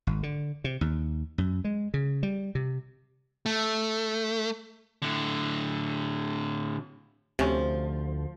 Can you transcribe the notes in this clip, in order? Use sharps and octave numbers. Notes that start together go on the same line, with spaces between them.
G#1
D3
C3
D#2
F#2
G#3
C#3
G3
C3
A3
A2 D3
D2 C3 F3 C#4